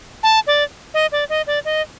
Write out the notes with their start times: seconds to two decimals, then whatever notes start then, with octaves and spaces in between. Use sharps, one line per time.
0.23 A5
0.47 D5
0.94 D#5
1.12 D5
1.29 D#5
1.47 D5
1.65 D#5